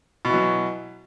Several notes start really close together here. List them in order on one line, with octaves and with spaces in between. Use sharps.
B2 E3 F#3